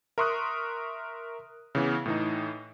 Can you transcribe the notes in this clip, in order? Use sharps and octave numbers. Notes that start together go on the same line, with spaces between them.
A#4 E5 C6 C#6 D#6 F#6
C#3 E3 B3
A2 E3 D#4